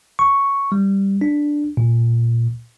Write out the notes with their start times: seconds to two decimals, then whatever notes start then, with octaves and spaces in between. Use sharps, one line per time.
0.19 C#6
0.72 G3
1.21 D4
1.77 A#2